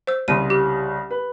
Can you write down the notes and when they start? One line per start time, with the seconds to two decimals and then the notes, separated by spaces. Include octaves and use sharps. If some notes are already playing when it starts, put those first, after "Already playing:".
0.07 C5 E6
0.28 C2 C#3 C6 D#7
0.50 G4
1.11 B4